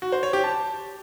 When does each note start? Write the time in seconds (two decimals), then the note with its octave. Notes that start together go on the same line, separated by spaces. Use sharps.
0.02 F#4
0.12 C5
0.23 C#5
0.33 G4
0.44 A5